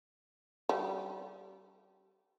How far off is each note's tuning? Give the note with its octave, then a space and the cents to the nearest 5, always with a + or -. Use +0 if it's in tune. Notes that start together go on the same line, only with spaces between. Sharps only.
G3 -35